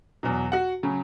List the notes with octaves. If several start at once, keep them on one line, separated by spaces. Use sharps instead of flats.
E2 B2 F#3
F#4 F#5
C#3 F#3